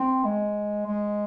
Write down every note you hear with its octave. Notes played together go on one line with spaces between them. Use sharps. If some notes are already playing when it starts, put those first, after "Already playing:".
Already playing: C4
G#3
G#3